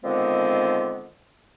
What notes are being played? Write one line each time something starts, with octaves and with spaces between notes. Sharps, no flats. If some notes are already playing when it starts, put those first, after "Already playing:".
D3 D#3 F3 G#3 B3 C4